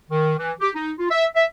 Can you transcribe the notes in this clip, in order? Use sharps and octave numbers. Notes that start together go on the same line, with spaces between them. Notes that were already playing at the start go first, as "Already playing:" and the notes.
D#3
E3
G4
D#4
F4
E5
E5